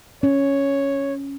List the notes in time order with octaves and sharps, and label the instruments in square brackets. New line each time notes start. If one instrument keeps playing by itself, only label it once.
[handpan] C#4 [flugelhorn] C#5